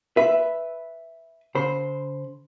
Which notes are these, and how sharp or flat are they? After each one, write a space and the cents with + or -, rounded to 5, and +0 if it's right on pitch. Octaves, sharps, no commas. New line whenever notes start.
B4 +0 E5 +0
D3 -45 C5 +0 B5 +0